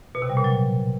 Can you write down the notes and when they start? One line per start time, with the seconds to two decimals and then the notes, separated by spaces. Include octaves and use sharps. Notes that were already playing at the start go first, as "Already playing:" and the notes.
0.15 B2
0.22 C3
0.30 G3
0.37 A#2
0.44 F#3